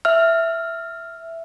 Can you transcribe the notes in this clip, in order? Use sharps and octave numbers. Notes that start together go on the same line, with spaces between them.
E5 F6